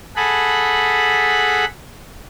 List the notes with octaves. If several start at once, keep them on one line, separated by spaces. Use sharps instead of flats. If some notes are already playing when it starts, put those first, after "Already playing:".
G#4 A4 F#5 B5